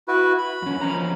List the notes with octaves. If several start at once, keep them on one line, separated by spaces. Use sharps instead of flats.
E4 F#4 B4
B5
F2 C#4
F3 C#4 A#5